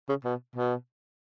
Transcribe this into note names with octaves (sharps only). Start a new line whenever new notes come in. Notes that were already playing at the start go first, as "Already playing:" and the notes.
C#3
B2
B2